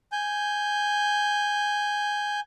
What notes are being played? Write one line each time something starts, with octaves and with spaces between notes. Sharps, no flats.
G#5 G6